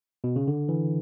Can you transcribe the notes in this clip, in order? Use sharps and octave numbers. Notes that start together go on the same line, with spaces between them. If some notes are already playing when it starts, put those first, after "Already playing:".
B2
C#3
D3
E3